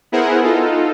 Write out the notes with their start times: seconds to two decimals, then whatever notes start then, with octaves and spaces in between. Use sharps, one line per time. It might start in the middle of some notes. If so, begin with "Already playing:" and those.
0.12 B3 E4 G#4 A#4 C5 F#5
0.43 D#4 F4 A4